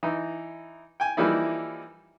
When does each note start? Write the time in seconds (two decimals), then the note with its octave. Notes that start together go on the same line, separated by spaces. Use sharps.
0.03 E3 D#4
1.00 G5 G#5
1.17 E3 F3 G3 A#3 D#4 E4